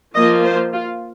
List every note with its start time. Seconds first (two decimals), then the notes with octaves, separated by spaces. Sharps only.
0.15 F3 A#3 F4 D#5
0.44 C5
0.73 F4